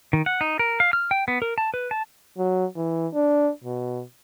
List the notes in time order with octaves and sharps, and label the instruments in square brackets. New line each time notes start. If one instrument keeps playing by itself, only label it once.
[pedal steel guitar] D#3
F#5
D#4
A#4
F5
F6
G5
B3
A#4
A5
B4
A5
[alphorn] F#3
E3
D4
B2